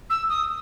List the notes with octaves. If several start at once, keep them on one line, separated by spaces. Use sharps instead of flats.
E6
D#6